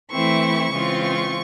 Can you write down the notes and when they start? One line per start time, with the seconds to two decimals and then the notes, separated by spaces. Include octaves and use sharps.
0.11 E3 A3 C4 E4 C#6
0.72 C#3 E3 G#3 C4 F4
1.03 C#6